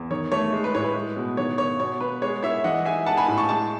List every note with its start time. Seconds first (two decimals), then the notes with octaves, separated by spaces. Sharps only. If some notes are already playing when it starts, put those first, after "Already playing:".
Already playing: E2
0.10 D#3 C#5
0.32 A3 C#5
0.52 G#3
0.64 B4
0.74 A2 C#5
0.84 B4
0.96 G#3
1.17 B2
1.37 D#3 C#5
1.58 G#2 C#5
1.80 B2 C#5
2.01 B3 B4
2.22 G#3 C#5
2.43 E4 C#5 E5
2.64 E3 D#5 F#5
2.85 D#4 E5 G#5
3.06 G#3 F#5 A5
3.17 G#5 B5
3.28 A2
3.38 A5 C#6
3.49 G#3 A5 C#6